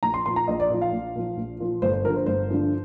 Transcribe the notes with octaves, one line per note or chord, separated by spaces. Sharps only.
A#1 A#5
C6
A#2 F3 C6
A#5
A#1 D#5
D5
A#2 F3
F5
A#1
A#2 F3
A#1
A#2 F3
G1 C5
C5
G2 D3 F3 A#4
C5
G1 C5
G2 D3 F3